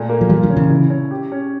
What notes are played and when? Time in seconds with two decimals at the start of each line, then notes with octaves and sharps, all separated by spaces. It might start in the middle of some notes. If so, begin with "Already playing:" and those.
Already playing: A#2 A3
0.09 A#3
0.21 F3
0.29 E3 G3 F4
0.43 D3 F3
0.50 C#4
0.56 C#3 E3
0.70 E4
0.90 C#4
1.11 G4
1.32 C#4